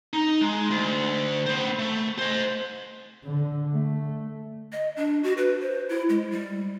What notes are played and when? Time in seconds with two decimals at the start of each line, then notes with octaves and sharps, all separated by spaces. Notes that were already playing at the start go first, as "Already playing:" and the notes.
0.13 D#4
0.41 G#3
0.71 D2
1.46 B3 C5
1.79 A3
2.18 C5 D#5
3.24 D3
3.73 A3
4.72 D#5
4.96 D4
5.23 F#4
5.37 B4
5.61 C5
5.89 E4
6.09 G#3
6.31 G3